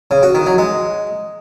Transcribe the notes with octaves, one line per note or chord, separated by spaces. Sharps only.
C#3
F#4
D#3
F#3
G#3